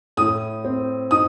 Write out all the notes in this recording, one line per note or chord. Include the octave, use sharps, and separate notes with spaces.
A2 D#6
C4
D#4 D#6